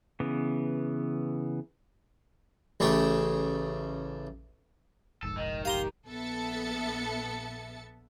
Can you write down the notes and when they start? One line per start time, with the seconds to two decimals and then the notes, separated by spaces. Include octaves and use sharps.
0.20 C#3 E3 B3
2.80 A1 C#3 A3 G4
5.23 F1 A#1 G#2 A4
5.37 D#3 D#5
5.65 G4 F5 A#5 C6
6.08 A#1 B3 A4 E5 A6 C#7